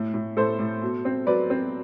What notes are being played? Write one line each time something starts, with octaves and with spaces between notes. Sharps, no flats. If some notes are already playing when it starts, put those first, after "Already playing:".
Already playing: A2
A2
A2 A4 C5
A2
B2
C4
F#3 B4 D5
C4